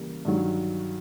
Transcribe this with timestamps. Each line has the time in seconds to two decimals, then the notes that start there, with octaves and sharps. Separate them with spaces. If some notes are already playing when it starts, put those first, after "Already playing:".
Already playing: C#3 E3 G3 A#3
0.25 G2 D#3 F#3